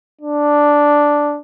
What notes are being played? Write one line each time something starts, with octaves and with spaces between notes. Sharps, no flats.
D4